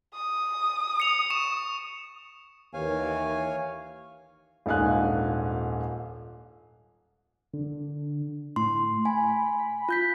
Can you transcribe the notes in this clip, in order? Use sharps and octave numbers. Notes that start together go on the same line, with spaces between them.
D#6
C#7 F7
C#6 E7
D#2 E3 C#5 F5 G#5
D#1 A#1 G#2 F5 G#5 F#6
D3
A2 C6
G#5 B5
F4 G6 B6